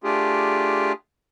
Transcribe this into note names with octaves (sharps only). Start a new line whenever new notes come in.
A3 D4 F4 G4 G#4